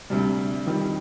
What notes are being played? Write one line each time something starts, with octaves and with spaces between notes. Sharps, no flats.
D2 C3 G3
F2 D#3 G3